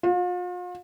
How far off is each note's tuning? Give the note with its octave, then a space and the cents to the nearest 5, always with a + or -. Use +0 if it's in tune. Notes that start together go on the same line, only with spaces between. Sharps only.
F4 +40